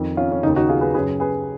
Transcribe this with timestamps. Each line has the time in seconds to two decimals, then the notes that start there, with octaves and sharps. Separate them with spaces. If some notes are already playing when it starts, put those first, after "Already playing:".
Already playing: F2 D#3
0.17 C#4 F4
0.32 C#4
0.43 C#3 D#4
0.47 D#2
0.56 D#4 F#4
0.69 F4 G#4
0.81 G#4 B4
0.94 F#2 C#3 G#4 B4
1.20 G#4 B4